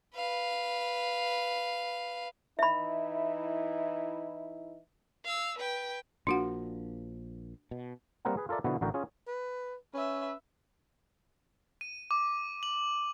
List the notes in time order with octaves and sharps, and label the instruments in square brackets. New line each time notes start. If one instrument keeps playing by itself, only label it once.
[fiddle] B4 F5
[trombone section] E3 D#4 E4 [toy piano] E5 B5
[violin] F5 E6
B4 G5
[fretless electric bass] A#1 F3 A#3 [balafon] D4 F#4 F#5
[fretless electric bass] B2
[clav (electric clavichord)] G3 A#3 C4 A#4 B4 F#5
G#4 B4
F4 A4 A#4 D5 E5
B2 D3 F3 B3 E4 F#4
A1 D3 F#4 A#4 G5
C#4 F4 G#4
[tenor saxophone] B4
[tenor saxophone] C#4 [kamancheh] B4 E5
[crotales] D#7
D6
F#7